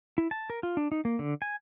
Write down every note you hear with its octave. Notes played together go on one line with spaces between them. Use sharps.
E4
A5
A#4
F4
D4
D#4
A#3
D3
G#5